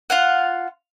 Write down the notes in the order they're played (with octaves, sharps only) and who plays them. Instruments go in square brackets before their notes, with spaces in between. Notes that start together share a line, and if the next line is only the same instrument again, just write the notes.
[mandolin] F4 F5 F#5